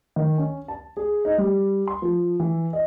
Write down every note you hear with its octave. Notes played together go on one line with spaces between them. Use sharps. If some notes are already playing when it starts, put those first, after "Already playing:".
D#3
C#4
A5
G#4
D#4
G3
C6
F3
E3
D#5